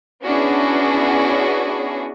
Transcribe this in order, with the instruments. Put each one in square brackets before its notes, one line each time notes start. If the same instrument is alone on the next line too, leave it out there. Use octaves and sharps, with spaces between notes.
[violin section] B3 C#4 D4 E4 F#4 G#4